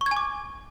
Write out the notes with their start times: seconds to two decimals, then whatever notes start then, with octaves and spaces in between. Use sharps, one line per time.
0.01 C#6
0.06 G#6
0.11 G#5
0.16 D6